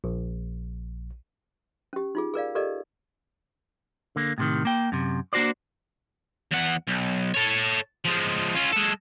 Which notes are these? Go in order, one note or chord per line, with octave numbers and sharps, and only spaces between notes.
A#1
C#4 G4
D#4 F4 G#4
G#4 A#4 D5 F5
G4 A4 A#4 D5 D#5
D3 A#3
A2 C3 D#3
A#3 G5
F#2 C3
A#3 D4 F#4 C5 D5
E2 F#5
B1
A4 C#5
F3 G#3
C#4 F4
G#3 A4